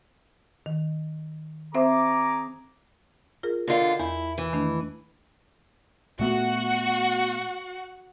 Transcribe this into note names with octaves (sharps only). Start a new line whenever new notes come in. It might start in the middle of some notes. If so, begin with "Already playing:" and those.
D#3
C4 G#4 C5 E5 A#5 D6
F4 G#4 A#4
D3 F4 A#4 D5 D#5
E2 E4
E3
D#3 A3 D4
A#2 A3 B3 F#4 F#5